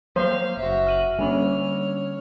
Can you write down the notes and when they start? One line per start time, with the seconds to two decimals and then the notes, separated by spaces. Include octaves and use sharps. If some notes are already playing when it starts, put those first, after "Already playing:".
0.16 F#3 A#3 C5 F5
0.57 F#1 F#4 E5
0.87 F6 D#7 F#7
1.19 D3 G3 A#3 C#4 C#5 F6